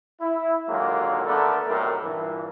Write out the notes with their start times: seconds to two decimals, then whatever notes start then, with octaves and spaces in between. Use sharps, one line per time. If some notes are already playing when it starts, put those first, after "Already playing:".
0.21 E4
0.69 D#2 A#2 D3 F#3 G#3 A#3
1.26 D3 A3 B3 A4 A#4
1.67 B1 A2 C3 A#4
2.03 G2 A#2 E3